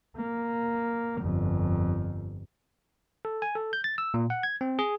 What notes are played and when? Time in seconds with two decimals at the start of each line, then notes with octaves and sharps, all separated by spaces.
0.16 A#3
1.21 G1 F2
3.25 A4
3.42 G#5
3.55 A4
3.73 G6
3.84 A6
3.98 E6
4.14 A#2
4.30 F#5
4.43 G#6
4.61 C4
4.79 G#4